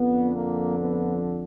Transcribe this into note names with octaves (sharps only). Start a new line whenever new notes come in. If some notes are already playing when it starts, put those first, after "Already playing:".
Already playing: F2 D3 F3 B3
A#3
B3